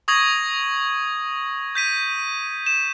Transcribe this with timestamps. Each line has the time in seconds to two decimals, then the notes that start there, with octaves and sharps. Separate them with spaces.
0.08 C#6 D#6 G#6 A#6 F#7
1.75 G6 B6 D#7
2.66 E7